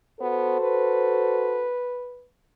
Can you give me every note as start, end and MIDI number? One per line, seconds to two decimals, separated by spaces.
0.21 0.57 59
0.21 1.69 66
0.21 1.69 69
0.21 1.69 72
0.61 2.25 71